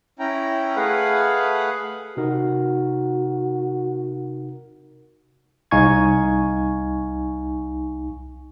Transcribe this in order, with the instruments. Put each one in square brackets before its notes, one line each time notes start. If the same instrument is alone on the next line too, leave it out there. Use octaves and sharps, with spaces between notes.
[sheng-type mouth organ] C#4 E4 G5 A#5
A3 G#4 B4 F5 F#5
[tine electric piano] C3 D#4 A#4 [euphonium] F#4
[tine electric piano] C2 D#4 F5 G#5 C#6 G#6